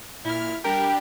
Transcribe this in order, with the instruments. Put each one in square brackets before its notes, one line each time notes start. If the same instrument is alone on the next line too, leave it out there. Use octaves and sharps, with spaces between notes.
[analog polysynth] A#2 F6 [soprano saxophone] E4
[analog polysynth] G3 D4 G4 [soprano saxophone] A#4 [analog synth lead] G5